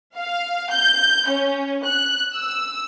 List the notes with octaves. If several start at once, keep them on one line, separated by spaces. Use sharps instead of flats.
F5
G6
C#4
F#6
E6